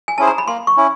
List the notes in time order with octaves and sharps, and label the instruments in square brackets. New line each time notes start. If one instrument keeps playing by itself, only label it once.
[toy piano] G#5
[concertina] C#4 E4 G#4 C5 [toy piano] A5
[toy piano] A#5
B5
[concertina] A#3 [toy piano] C6
[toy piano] C#6
[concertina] C#4 E4